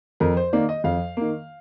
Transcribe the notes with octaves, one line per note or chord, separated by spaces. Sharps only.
F2 A#4
C5
D#3 A#3 D5
D#5
F2 F5
D#3 A#3